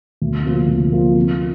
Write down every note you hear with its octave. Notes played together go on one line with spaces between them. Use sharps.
D2
C3 F3 A#3 F4
D2
C3 F3 A#3 F4
F3